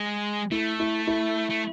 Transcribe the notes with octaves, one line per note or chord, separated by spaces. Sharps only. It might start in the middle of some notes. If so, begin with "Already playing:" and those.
Already playing: G#3
A3 E4
E4
E4
A3